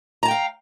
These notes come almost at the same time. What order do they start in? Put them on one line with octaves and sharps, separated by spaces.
A#5 A5 G5 F5